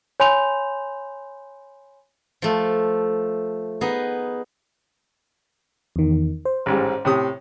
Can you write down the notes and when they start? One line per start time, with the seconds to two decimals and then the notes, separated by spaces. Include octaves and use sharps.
0.20 C#5 G#5 B5 C6 G6 F7
2.42 F3 A3
3.81 B3 D#4 G#4
5.96 E2 D#3
6.45 C5
6.66 A1 G#2 G3
7.05 A2 C3 D#6